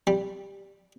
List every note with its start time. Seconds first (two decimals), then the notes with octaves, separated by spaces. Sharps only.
0.07 G3